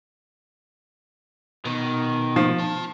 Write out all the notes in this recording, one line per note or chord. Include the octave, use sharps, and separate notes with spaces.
B2 D#3
F3
F4 A5